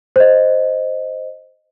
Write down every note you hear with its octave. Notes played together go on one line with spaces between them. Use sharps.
C5 D#5